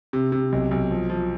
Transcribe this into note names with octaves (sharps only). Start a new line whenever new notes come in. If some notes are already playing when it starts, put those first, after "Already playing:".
C3
C3
B1
B1
F3
F3